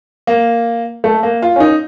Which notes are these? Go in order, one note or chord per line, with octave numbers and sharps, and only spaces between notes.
A#3
A3
A#3
F4
C#4
D#4